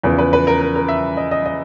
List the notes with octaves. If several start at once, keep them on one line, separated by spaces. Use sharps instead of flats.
E2 C#3 F3 B4
B4
B4
A#4
A#4
A#4
E5
D#5
D#5
D#5